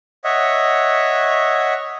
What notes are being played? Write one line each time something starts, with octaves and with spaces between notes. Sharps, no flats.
C#5 D#5 E5 F#5